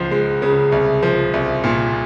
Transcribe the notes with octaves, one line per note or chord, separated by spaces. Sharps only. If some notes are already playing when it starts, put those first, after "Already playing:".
Already playing: C#2 F3
G#3
C#3
C2
F3
C2
A#2